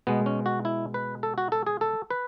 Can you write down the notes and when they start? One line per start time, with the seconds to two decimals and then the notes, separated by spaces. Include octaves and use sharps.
0.07 B2 G#3 B3
0.26 C#4
0.46 F#4
0.65 E4
0.94 B4
1.23 A4
1.38 F#4
1.52 A4
1.67 G#4
1.81 A4
2.10 B4